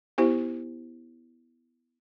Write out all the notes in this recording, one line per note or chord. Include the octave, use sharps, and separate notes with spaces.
B3 E4 G4 C5